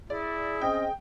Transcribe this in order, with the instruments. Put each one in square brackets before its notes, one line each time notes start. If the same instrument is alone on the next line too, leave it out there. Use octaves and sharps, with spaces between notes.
[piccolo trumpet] E4 [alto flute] G#4 [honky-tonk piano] D5
[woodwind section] C4 C#4 D#5 [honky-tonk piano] G5